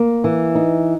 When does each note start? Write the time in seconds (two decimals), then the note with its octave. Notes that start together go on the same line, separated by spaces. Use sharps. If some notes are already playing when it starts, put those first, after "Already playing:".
Already playing: A#3
0.24 E3
0.55 D#4